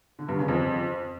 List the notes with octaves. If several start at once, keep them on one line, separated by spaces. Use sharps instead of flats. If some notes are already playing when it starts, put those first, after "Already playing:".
D3
G2
C#3
F2